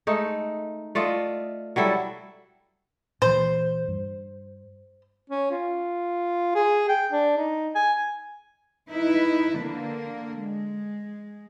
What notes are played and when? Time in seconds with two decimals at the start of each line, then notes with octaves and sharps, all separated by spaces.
0.07 G#3 A3 D#4
0.95 A3 F4 D5 D#5
1.76 F#3 G3 E4 A4
3.22 A#2 E3 C5
3.88 G2
5.30 C#4
5.51 F4
6.55 G#4
6.89 G5
7.12 D4
7.37 D#4
7.75 G#5
8.90 D#4 E4 B4
9.55 D3 A#3
10.37 G#3